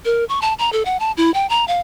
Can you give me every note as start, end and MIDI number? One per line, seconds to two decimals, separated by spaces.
0.05 0.24 70
0.29 0.42 85
0.42 0.54 81
0.59 0.72 82
0.73 0.85 69
0.85 0.99 78
1.00 1.12 81
1.17 1.33 64
1.34 1.48 79
1.50 1.67 82
1.68 1.80 77